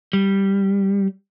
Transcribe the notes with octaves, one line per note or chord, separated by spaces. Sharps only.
G3